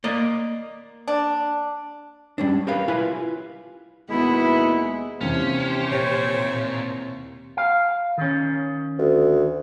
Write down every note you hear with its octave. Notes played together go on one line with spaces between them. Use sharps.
A#3 D5 D#5
D4
G3 C#4 D4
G4 A#4 B4 C#5 F5
E4 F4 B4 F5 G#5
D#2 B2 G#3 B3 E4
D#2 C3 E3 C#4 G4 C5
A#2 C#5
F5
D#3 C#4
D2